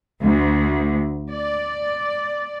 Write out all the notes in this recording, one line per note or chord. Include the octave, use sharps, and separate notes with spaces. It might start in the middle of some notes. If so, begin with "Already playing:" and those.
D2
D5